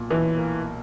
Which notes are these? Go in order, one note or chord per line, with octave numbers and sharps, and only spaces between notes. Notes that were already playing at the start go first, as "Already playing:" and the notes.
Already playing: B1 A#2 A#3
B1 E3
A#3